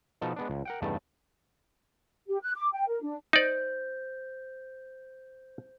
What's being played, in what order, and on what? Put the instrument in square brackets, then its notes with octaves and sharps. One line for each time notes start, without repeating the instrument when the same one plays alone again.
[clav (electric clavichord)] B2 F3 D#4 A4
G#3 B3 D4
C#2
A#4 F#5 G5
E2 G2 C#3 A3 D#4 A5
[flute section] G4
F#6
D6
G5
A#4
D4
[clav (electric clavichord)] D#4 D5 [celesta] C5 G6